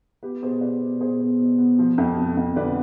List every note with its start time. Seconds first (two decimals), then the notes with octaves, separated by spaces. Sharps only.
0.23 B3 G4 B4
0.42 B2 G#4 C5
0.61 B3 B4 D5
0.81 B2
1.00 B2 G#4 C5
1.19 B3
1.39 B2
1.58 B3
1.79 F3
1.98 F2
2.17 F3
2.37 F2
2.56 D3 B4 D5